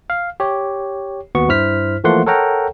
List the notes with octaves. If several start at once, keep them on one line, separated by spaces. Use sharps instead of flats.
F5
G4 C#5
D#2 B3 F#4 C#6
G2 E4 C5 F6 B6
E3 F3 A3 A#3 F#5 C6
A4 A#4 C#5 F#5 G5 A#5